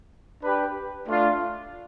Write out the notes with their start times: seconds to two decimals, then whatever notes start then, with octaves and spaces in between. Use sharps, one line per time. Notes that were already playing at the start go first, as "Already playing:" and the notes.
0.42 D4 G4 B4
1.07 A3 D4 F4